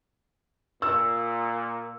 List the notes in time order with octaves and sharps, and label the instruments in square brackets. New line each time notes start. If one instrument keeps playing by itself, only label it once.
[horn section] A#2 [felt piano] E6